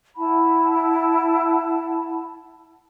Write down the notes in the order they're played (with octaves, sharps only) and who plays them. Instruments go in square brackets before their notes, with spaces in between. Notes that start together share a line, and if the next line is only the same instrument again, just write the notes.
[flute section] E4 F#5 A5 B5